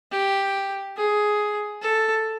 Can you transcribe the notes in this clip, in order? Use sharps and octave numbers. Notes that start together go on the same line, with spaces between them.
G4
G#4
A4